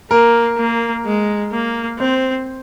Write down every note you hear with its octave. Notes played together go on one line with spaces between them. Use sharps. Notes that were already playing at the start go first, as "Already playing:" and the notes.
A#3 A#4
A#3
G#3
A#3
C4 C5